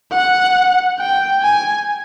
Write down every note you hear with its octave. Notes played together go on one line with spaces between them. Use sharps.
F#5
G5
G#5